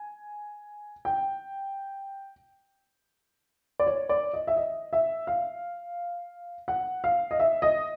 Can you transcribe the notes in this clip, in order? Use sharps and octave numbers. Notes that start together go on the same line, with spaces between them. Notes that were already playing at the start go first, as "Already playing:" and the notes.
Already playing: G#5
G5
D5
C#5
D5
D#5
E5
D#5
E5
F5
F#5
F5
D#5
E5
D#5